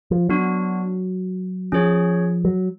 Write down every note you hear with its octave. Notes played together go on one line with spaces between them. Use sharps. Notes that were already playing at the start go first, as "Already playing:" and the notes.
F3
F#3 B3 D4 F#4
F3 C#4 G#4 C#5
F#3